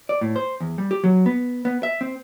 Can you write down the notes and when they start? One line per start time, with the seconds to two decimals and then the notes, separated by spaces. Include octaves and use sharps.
0.09 D5
0.21 A2
0.36 C5
0.61 E2
0.78 G3
0.91 G4
1.04 F#3
1.26 B3
1.65 B3
1.83 E5
2.01 C4